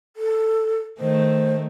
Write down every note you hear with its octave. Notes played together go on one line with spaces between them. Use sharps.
A4
D#3 A3 C5